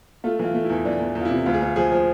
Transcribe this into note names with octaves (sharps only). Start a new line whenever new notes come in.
A3 F4
E3
F4
A3
E4
E2
E3 D4
E2
E2
F4
E4
C3
D2 F4
G#4
D2 F4
F3 G#4
F3